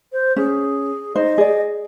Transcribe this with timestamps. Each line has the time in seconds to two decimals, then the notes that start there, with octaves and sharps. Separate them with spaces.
0.12 C5
0.36 C#4 G#4
1.15 D#4 C5 D#5
1.38 G#4 D5